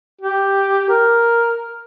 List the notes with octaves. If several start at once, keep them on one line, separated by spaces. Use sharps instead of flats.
G4
A#4